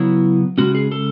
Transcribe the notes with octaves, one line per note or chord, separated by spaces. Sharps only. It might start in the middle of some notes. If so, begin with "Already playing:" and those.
Already playing: C#3 F#3 B3 E4
C#3 G#3 C#4 F#4
G#4
A4